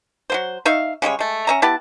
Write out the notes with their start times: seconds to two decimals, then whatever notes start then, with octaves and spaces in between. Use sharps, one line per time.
0.30 F#3 A#3 C5
0.65 D#4 E5 F5 C#6
1.02 C#3 G3 G#3 C#5
1.19 G#3 A3
1.47 C#4 E5 A#5
1.62 B3 E4 G4 A5